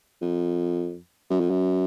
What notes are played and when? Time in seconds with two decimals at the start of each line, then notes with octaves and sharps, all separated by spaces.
0.22 F2
1.30 F#2
1.40 F2
1.50 F#2